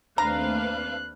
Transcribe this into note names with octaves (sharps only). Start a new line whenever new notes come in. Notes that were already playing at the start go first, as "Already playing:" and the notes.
D#2 A3 C4 D4 B4 F5 A#5 F#6